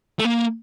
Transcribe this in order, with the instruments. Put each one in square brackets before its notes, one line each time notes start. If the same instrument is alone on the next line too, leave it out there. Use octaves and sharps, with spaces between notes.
[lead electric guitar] A3
A#3